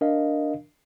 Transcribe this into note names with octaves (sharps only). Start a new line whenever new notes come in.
D4 A#4 D#5 F5